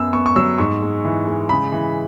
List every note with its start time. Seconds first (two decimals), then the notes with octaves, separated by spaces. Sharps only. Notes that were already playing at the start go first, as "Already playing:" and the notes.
Already playing: F#2 B3 E6
0.13 B3 C#6
0.26 C#6
0.36 F#3 E6
0.58 G#2 C#6
0.82 G#3
1.05 E3
1.27 G#3
1.49 C#3 B5
1.72 E3